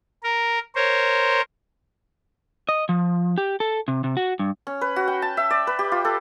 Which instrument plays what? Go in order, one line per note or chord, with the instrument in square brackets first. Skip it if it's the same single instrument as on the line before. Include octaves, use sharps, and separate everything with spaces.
[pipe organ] A#4
A#4 C5 C#5
[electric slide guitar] D#5
F3
G4
A4
C3
C3
F#4
G2
[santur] C#4
B4
F#4
G5
A5
E5
D5
B4
G4
F4
A4